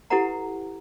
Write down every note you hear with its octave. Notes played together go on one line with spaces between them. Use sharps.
E4 G4 A4 B4 F#5 A#5